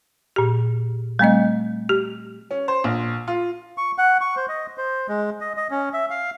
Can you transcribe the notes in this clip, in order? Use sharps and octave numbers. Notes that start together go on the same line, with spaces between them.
A#2 G4
G3 A3 C4 D#5
G4
C#4
C5
A#1
F4
C#6
F#5
C#6
C5
D#5
C5
G#3
D#5
D#5
C#4
E5
F5